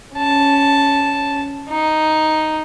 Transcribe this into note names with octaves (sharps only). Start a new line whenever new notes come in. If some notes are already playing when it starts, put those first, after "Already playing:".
C#4 A5
D#4